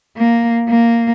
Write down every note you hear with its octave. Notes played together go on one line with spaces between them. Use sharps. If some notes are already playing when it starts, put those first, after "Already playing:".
A#3
A#3